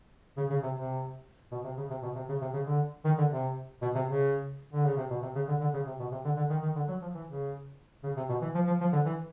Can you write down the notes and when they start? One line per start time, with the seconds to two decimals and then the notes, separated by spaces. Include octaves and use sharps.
0.37 C#3
0.50 C#3
0.63 C3
0.76 C3
1.52 B2
1.64 C3
1.77 C#3
1.90 C3
2.03 B2
2.16 C3
2.29 C#3
2.42 C3
2.54 C#3
2.67 D3
3.05 D#3
3.18 D3
3.31 C3
3.82 B2
3.95 C3
4.08 C#3
4.73 D3
4.86 C#3
4.97 C3
5.10 B2
5.22 C3
5.35 C#3
5.48 D3
5.61 D3
5.74 C#3
5.86 C3
6.00 B2
6.12 C3
6.25 D3
6.37 D3
6.50 D#3
6.62 D#3
6.76 D3
6.88 F#3
7.02 F3
7.15 E3
7.27 C#3
8.04 C#3
8.17 C3
8.29 B2
8.42 E3
8.55 F3
8.67 F3
8.80 F3
8.93 D3
9.06 E3